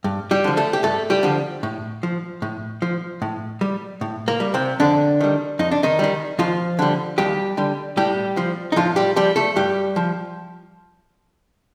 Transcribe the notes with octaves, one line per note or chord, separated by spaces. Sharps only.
G2
G3 G4
D3 F3
A3 A4
G4
G2 A3 A4
G3 G4
D3 F3
A2
F3
A2
F3
A2
G3
A2
A#3
G3
C3 C4
F2 D3 D4
D#3 G3
F2 D#4
D4
D#3 D#4
D#3 G3
D#2 F3 F4
D3 G3
D#2 G3 G4
D3 G3
A2 G3 G4
F3
D#4
A2 F3 F4
G3 G4
F3 G3 G4
A3 A4
G2 G3 G4
F3